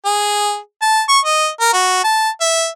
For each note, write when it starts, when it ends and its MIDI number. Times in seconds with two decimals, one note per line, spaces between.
0.05 0.58 68
0.82 1.03 81
1.09 1.19 85
1.25 1.48 75
1.61 1.71 70
1.74 1.99 66
2.04 2.30 81
2.41 2.68 76